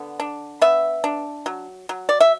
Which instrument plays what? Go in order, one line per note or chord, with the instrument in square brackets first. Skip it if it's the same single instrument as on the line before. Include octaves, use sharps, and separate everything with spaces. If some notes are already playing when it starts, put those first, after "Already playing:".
Already playing: [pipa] D3 B3
D4
B3 E5
D4
F#3
F#3
D5
E5